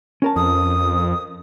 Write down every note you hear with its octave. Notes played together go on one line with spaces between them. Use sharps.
C#4 A#4 A5
F2 D#6